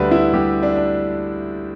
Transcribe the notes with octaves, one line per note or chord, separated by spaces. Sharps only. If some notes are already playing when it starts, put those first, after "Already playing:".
Already playing: D2 D3 G3 B4 B5
E4 E5
G3 G4
D4
D4